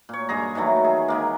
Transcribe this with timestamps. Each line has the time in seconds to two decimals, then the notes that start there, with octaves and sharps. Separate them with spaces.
0.09 A#2 C#5
0.29 G2 G#3 G#4 A#5
0.55 D#3 E3 F#3 A3
0.84 G#4
1.08 D#3 G#3 A#3